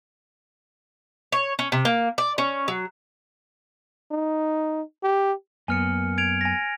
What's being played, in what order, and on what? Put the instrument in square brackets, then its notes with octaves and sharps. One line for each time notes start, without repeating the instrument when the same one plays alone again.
[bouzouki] C#5
C#4
C3
A#3
D5
C#4
F#3
[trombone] D#4
G4
[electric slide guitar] F#2 A#3 B3 [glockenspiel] G#5 F6 C#7
[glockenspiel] G#6 D7 F7
G#5 A#6